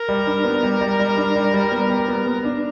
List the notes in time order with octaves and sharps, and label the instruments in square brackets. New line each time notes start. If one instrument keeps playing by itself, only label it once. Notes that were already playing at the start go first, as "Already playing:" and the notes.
Already playing: [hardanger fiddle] A#4
[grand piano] G3
D4
B3
G3
G3
G3
D4
G3
G3
B3
G3
B3
B3
D4